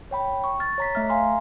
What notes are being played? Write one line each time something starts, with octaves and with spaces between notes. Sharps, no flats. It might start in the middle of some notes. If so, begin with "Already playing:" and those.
C#5 G5 B5
C#6
F6 A6
C#5 A#5 B6
A3 E5 F6
F5 G#5 A#5 C6 F6